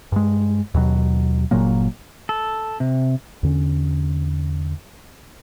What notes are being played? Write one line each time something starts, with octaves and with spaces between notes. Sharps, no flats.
G2 G#3
D#2 B2 F#3
G1 A#2 F#3 A#3
A4
C3
E2 D3 C#4